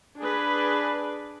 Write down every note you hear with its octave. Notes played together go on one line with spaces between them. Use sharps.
D4 G#4 B4